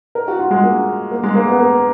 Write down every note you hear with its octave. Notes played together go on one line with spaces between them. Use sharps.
A#4
F#4
F4
G#3
A#3
A#3
G#3
A#3
B3
A#3